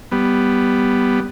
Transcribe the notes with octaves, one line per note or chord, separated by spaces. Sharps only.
G3 B3